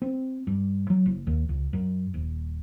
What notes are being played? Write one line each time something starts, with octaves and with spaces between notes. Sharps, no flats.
C4
G2
F#3
F#1
D#2
C#2
F#2
D#1